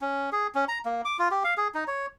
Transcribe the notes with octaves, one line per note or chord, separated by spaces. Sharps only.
C#4
G#4
C#4
A#5
A#3
D6
F4
G4
F5
G#4
D#4
C#5